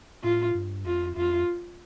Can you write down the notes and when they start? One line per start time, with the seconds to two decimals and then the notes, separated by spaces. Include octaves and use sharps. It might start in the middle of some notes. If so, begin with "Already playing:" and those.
0.24 A2 F4
0.55 G2
0.85 F2 F4
1.17 F2 F4